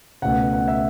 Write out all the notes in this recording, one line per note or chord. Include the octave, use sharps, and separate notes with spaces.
C#2 B2 A3 F#5
F#5
E5